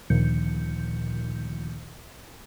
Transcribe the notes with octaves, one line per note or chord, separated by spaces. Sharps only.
D2 A#2 D#3 F3 G6 C#7